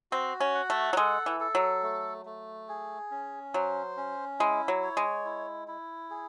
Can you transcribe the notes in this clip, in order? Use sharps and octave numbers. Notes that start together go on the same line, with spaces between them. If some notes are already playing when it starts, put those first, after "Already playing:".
C4 F#4
C#4
F#5
A3
F#3
G#3 A4
E3
A4
F#3
A3
A3
G#4
C#4
F#3 C5
C#4
G#3 E4
F#3
C#5
G#3
E4
E4
G#4